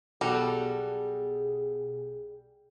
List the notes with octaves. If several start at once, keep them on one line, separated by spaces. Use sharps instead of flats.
B1 B2 G3 F#4 G#4 A4